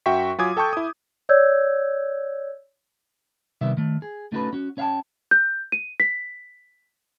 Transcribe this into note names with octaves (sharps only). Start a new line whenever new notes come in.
F#2 F#4 E5 G5 C#6 B6
F#3 F4 G#5 D6 D#6 G#6
A4 G5 A5 C#6 G6
E4 D#6
C#5 D5 E6 G6 G#6
C3 D#3 G3 B3 E5
D#3 A3
G#4
A3 C#4 D#4 F#4 A4 B4
C#4 F#4
C#4 C#5 E5 F5 G5 A5
G6
D#7
B6